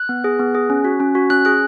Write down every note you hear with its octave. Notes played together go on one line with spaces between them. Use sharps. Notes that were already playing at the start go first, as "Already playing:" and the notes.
Already playing: F#6
B3
G#4
B3
G#4
C#4
F#4
C#4
F#4
C#4 F#6
G#4 F#6